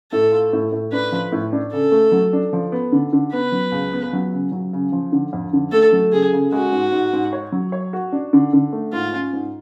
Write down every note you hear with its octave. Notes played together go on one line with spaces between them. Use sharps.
A2 A4
F4
A2
A2
D4 B4
F3
A2
D4
C#3 A4
A3
F#3
D4
F3
B3
D3
D3
B3 B4
F#3
C#2
B3
F#3
C#3
F#3
C#3
F3
D3
F2
D3
A3 A4
F#3
C#3 G#4
C#3
G#3 F#4
G#2
G#2
G#2
C#5
F#3
C#5
F#4
D4
D3
D3
A3
G#2 F4
C#4
G#2